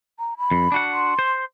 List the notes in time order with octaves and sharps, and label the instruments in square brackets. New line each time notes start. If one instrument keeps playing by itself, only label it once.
[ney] A#5
B5
[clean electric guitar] F2
D4 F#4 F#5
[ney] C6
[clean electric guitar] C5